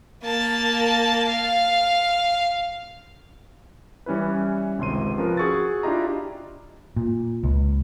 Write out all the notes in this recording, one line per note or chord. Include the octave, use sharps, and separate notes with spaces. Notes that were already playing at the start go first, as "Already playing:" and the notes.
A#3 A5
F5
E3 G3 C#4 E4 B4
G#1 C#2 C3 C6 D#7
F3 C#4 A#4 B4
F#4 G#4 C#6 E6 A6
D4 E4 F4 G4 D#5 A#5
A#2
C#2